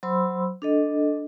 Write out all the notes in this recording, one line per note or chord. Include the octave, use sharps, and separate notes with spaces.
F#3 C5 B5 C6 E6
D4 A4 D#5